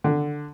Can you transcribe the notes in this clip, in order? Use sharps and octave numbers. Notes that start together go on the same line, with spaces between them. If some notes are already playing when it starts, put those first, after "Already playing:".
D3